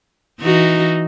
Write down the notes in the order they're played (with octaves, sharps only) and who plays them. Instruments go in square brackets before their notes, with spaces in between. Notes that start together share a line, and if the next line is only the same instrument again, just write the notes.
[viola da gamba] E3 D#4 F#4